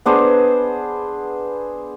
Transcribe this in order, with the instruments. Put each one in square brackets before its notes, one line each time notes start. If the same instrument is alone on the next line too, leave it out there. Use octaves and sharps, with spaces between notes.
[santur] B3 D4 G#4 C5